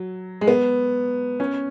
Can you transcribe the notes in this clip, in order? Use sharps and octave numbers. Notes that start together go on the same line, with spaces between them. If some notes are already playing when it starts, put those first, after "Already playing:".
Already playing: F#3
G#3
B3
C#4